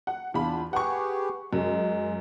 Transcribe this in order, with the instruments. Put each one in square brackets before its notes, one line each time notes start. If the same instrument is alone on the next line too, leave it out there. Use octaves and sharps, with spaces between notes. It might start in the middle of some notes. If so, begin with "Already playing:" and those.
[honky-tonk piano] F#5
[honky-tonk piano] E2 B5 [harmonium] D4 F4
[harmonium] G4 G#4 B4 [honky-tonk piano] F#5 C#6
[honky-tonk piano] F#2 [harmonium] G#3